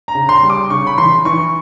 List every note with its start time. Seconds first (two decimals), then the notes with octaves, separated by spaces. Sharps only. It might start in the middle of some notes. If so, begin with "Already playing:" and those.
0.08 A#5
0.15 C#3
0.29 C6
0.43 G3
0.50 D6
0.70 C#3 C#6
0.87 B5
0.98 E3 C6
1.25 E3 C#6